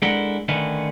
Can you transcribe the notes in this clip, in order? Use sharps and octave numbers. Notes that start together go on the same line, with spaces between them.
G#3 D4 E4 A4 A#4 F#5
D3 D#3 A3 C#4 D#4 B4